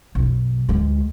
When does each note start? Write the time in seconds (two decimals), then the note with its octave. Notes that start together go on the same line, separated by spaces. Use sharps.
0.15 B1 F#2
0.69 D2 G#3